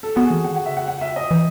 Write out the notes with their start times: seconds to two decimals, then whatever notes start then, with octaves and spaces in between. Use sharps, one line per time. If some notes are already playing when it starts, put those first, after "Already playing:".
0.03 A4
0.16 B3 F#4
0.24 G#4
0.30 E3
0.44 D#3 F#5
0.56 F#5
0.66 C#3 E5
0.77 F#5
0.88 F#5
1.01 E5
1.16 D#5
1.31 E3